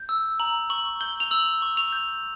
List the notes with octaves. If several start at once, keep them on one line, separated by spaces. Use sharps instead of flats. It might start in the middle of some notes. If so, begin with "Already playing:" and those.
Already playing: G6
E6
A#5 F#7
C#6 F#7
G6 G7
F7
E6 F#7
C#6
F7
G6